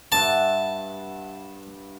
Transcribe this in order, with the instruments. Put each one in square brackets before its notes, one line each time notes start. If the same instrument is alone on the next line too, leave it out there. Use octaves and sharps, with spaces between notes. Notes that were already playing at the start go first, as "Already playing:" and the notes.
[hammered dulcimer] G2 E5 F#5 [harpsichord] A5